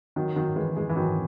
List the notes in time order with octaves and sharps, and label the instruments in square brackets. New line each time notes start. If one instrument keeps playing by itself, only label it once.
[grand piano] D#3 F#3
D#3 F#3
E3 G#3
E3 G#3
E3
D#3 F#3